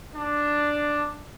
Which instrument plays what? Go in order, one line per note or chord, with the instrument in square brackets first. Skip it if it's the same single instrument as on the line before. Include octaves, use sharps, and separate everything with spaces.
[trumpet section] D4